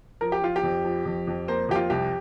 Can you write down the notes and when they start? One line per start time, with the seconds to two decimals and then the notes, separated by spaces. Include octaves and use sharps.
0.21 F3 A#4
0.32 G4
0.42 F3 F4
0.56 G4
0.63 F2
0.85 F3
1.05 F2
1.27 F2
1.48 A#3 C5
1.69 F2 G4
1.76 F4
1.90 C2 G4